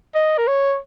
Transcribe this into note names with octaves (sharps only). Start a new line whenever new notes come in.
D#5
A#4
C#5